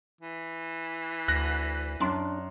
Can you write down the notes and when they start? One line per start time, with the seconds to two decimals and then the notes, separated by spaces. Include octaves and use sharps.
0.21 E3
1.28 D2 F#6 A#6
2.00 F#2 D4 C6